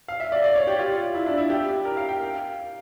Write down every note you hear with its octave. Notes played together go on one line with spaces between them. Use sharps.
F5
E5
D5
D5
C#5
G4
F4
E4
D4
E4
G4
A#4
F5
G5
F5